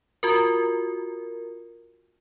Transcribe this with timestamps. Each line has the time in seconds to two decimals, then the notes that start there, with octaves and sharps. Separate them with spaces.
0.23 F4 F#4 A#4